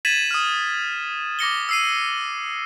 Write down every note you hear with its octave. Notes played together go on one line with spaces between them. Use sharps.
G#6 A6 B6 D#7 E7 F#7
D#6 F6
D6 A#6 C#7 G7
E6 C7 D#7